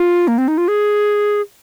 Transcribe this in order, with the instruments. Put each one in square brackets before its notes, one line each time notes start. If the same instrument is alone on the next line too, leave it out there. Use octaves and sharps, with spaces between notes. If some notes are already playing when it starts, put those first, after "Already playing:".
Already playing: [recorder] F4
A#3
C4
D#4
F4
G#4